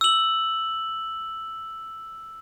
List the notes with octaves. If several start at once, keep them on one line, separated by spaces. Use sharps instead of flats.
E6 F#7